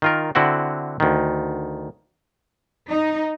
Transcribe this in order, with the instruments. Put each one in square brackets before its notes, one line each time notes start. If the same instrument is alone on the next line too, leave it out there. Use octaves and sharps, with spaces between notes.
[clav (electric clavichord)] D#3 F4 A#4
D3 C4 E4 F#4 F#5
D2 D#3
[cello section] D#4